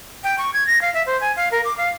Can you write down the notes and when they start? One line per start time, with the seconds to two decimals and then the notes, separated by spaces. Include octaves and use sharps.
0.24 G5
0.38 C#6
0.54 G#6
0.67 A#6
0.82 F5
0.94 E5
1.06 C5
1.21 G#5
1.36 F5
1.52 A#4
1.65 D6
1.78 F5